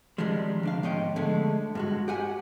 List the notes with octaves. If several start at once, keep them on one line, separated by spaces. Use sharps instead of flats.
C3 D#3 F3 G3 G#3
D2 D4 F5
G#2 F3 B3 C#5 D#5 G5
D3 G#3 A3
G2 G#3 F#4
G4 F#5 G#5